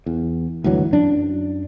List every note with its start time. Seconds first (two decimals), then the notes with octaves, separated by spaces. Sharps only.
0.06 E2
0.64 D2 G2 E3 F#3
0.93 F#2 D4